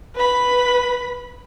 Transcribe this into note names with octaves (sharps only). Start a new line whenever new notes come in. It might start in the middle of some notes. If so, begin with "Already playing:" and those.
B4 B5